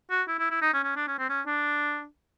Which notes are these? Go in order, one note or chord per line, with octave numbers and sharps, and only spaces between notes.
F#4
E4
E4
E4
D#4
C#4
C#4
D4
C#4
C4
C#4
D4